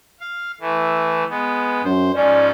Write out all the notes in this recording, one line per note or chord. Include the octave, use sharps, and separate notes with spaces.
F5
E3 A3
G#3 B3
F#2 C5
G#2 F3 C#4 D5